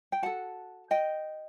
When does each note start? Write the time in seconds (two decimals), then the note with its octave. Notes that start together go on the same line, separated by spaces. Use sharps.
0.12 G5
0.22 F#4 A4 F#5 A5
0.91 D#5 G5